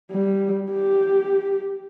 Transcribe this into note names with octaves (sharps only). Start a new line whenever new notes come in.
G3
G4